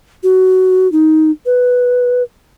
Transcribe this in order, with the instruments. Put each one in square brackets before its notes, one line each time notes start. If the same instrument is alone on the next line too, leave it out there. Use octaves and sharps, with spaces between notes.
[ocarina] F#4
D#4
B4